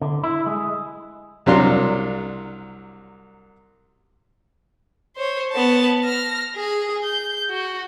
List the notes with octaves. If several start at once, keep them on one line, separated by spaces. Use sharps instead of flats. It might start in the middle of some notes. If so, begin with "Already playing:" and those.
D3
E4
G#3
C2 C3 F#3 D4 F5 C6
C5 C#5
B3 A5
F6 A#6
G#4
G6
F#4